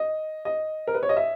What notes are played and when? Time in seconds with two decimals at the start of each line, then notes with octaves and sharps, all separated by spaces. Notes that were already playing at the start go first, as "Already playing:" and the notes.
Already playing: D#5
0.45 D#5
0.87 A#4
0.94 B4
1.03 C#5
1.09 D#5
1.17 E5